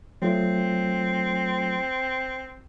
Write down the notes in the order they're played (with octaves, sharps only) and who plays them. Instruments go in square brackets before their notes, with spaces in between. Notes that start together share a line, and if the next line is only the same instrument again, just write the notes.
[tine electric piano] F#3 A3 F4 [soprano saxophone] C4